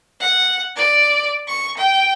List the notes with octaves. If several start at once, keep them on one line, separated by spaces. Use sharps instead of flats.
F#5
D5
C#6
G5